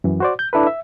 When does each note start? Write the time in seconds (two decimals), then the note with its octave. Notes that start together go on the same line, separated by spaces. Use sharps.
0.04 F#2 E3
0.20 F#4 C5 D5
0.39 G6
0.53 D4 E4 A4 B4
0.67 E5